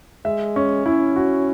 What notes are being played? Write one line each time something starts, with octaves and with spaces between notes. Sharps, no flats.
G#3 E5
C#4
C#4 E4
F#4